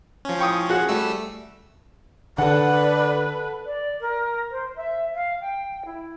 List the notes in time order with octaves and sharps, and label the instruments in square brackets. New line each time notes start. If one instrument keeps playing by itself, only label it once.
[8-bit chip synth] F3 C#4
[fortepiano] G5 C#6 D#6
F#4 G#4 F#5
[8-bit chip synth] G3 A3 E6
[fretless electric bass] D3 [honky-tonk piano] A4 F#5 [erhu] B4 [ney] D5
[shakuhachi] D5
A#4
C5
E5
F5
G5
E4